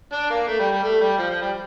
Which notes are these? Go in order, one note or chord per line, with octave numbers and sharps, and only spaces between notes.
D4
A#3
A3
G3
G3
A3
G3
F3
F3
G3